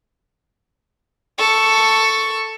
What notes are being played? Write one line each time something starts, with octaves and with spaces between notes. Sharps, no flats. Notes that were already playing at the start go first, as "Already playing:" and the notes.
A4 C#6